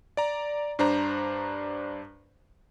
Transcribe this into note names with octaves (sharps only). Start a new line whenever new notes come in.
D5 A#5
G2 D4 C5 A#5